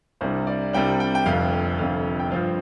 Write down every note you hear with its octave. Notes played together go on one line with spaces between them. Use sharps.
C2 C3 G3 D4 C5
D5
C2 C3 G3 D4 G5
G5
G5
F1 F2 D3 F5
F1 F2 D3 F5
G5
G2 F3 C4 F4 F5